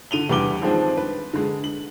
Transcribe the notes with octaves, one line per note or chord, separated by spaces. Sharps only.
D3 D#7 F7 G7
E2 G3 B4 D6 G7
D#3 F3 G#3 C4 D4
B4
D3 G#3
F#7